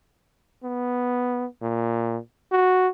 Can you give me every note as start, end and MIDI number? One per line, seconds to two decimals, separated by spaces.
0.64 1.45 59
1.62 2.17 46
2.52 2.88 66